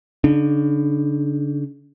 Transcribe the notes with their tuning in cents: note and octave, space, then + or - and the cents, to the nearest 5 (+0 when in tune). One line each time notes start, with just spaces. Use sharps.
D3 -45 D4 +40